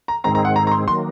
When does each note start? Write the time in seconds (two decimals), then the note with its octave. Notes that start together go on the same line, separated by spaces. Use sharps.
0.08 A#5
0.24 G#2 D#3 G#3 C4 A#5
0.35 A#5
0.45 F#5
0.56 A#5
0.67 A#5
0.71 C6
0.88 D#3 F#3 A#3 C6